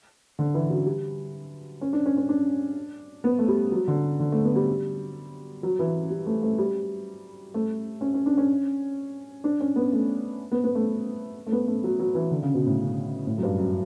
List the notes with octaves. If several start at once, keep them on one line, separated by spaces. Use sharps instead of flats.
D3
E3
F#3
G3
C#4
D4
C#4
C#4
D4
B3
A3
G3
F#3
D3
D3
A3
B3
G3
F#3
E3
G3
A3
A3
G3
A3
C#4
C#4
D4
C#4
D4
C#4
B3
A3
B3
B3
A3
A3
B3
A3
F#3
F#3
E3
D3
C#3
B2
A2
A2
F#2
G2
F#2